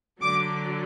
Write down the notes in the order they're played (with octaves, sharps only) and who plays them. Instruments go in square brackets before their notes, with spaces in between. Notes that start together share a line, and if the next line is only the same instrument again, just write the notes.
[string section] D3 F#3 D6